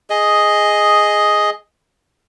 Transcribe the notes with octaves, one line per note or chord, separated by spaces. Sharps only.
G#4 D#5